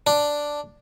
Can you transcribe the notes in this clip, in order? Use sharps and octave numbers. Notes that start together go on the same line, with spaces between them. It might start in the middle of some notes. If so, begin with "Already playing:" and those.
D4